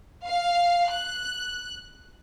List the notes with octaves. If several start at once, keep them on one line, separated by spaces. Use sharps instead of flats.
F5
F#6